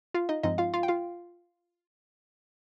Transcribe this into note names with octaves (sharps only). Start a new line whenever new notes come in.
F4 F5
D#4 D#5
G2 F3 G#3 C4 D#4 D#5
F4 F5
F4 F5
G5
F4 F5